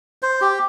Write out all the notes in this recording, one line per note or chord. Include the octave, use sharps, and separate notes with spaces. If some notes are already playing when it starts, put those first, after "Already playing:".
C5
G4